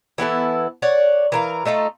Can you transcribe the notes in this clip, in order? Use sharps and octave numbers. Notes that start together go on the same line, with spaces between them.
E3 B3 E4 A4
C#5 D5 F#5
E3 A#4 F5
A3 D#4 F4 A4